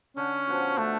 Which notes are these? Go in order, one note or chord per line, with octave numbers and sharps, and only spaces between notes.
D3 C#4
F3 B3 F#4
D3 A3